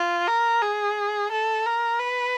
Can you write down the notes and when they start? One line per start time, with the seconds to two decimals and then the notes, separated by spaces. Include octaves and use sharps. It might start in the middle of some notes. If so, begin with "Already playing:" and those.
Already playing: F4
0.28 A#4
0.62 G#4
1.32 A4
1.66 A#4
1.99 B4